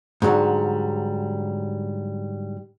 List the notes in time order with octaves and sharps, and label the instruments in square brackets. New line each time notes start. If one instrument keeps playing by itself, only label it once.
[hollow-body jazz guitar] G#2 D3 F#3 G3